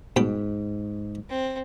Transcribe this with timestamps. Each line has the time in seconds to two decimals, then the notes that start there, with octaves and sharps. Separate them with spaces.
0.16 G#2 B2 G5
1.29 C4